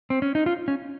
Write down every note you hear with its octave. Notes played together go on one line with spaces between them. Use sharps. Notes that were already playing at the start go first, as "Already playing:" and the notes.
C4
C#4
D#4
F4
C#4